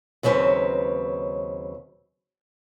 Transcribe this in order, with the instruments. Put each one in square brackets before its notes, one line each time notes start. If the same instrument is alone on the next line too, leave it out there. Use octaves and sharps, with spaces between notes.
[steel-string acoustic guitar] D#2 C#3 F#3 C4 B4